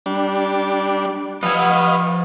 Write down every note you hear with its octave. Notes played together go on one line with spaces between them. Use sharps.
G3 D4
F3 B4 D#5 F5 F#5